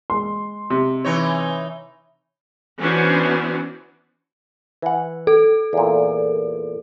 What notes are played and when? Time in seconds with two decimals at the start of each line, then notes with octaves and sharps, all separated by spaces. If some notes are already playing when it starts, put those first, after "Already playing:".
0.10 G#3 C6
0.70 C3
1.05 E3 D#4 C#5
2.79 E3 B3 C#4 D4 F#4 C5
4.82 E3 F#5
5.27 A4
5.73 E2 A#2